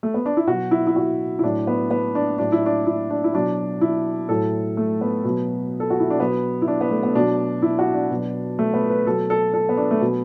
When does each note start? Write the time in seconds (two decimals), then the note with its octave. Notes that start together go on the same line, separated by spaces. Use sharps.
0.03 A3
0.14 B3
0.26 D4
0.37 E4
0.48 B2 F#3 F#4
0.71 E4
0.87 E4
0.96 F#4
1.39 E4
1.43 A2 F#3 D4
1.67 B3
1.91 B3
2.15 D4
2.38 A2 F#3 D4
2.52 E4
2.66 D4
2.87 E4
3.10 D4
3.24 E4
3.33 B2 F#3 D4
3.81 E4
4.29 A2 F#3 A4
4.77 A3
5.01 B3
5.25 B2 F#3
5.80 A4
5.90 F#4
6.00 E4
6.10 D4
6.20 B2 F#3 B3
6.62 E4
6.68 D4
6.81 B3
6.91 A3
7.03 B3
7.15 B2 F#3 D4
7.62 E4
7.79 F#4
7.94 D4
8.11 B2 F#3
8.59 A3
8.74 B3
8.90 B4
9.06 B2 F#3 A4
9.30 A4
9.54 A4
9.69 B3
9.77 D4
9.91 A3
10.01 B2 F#3 B3